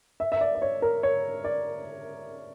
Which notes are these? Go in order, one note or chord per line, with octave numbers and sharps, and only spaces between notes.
E5
E5
D5
D5
C#5
A#4
C#5
D5